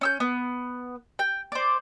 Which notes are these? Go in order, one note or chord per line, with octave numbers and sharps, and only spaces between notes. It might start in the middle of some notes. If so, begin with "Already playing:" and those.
C#4 E6 G6
B3
G5
C5 D5